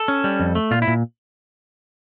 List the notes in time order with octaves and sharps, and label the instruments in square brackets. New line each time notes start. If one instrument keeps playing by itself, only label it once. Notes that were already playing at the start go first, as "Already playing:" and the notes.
Already playing: [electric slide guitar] A4
C#4
G3
F2
A3
A#2 F4
E4
A#2